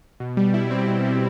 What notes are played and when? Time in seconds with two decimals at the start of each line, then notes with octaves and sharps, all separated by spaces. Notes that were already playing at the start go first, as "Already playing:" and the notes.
0.20 B2
0.37 G3
0.54 E4
0.71 C4
0.88 B2
1.05 G3